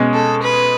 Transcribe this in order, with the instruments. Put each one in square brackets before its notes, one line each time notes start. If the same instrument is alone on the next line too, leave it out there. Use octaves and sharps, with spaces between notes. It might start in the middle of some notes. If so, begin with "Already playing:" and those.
Already playing: [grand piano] B2 G#3 C#4
[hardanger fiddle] A4
B4